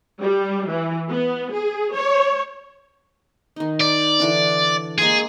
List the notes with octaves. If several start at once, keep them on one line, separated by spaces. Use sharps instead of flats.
G3
E3
B3
G#4
C#5
D#3 D#4
D5
D3 E3 D4
G#3 A#3 G#4 C6